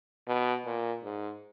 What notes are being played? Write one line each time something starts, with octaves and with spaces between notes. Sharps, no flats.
B2
A#2
G#2